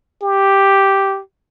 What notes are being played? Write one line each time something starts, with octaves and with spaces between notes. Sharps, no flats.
G4